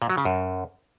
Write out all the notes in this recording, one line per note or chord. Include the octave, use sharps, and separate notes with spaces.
A#2
F#3
C#3
F#2